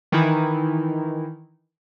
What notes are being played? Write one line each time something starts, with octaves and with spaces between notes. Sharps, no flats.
D#3 E3 D#4 E4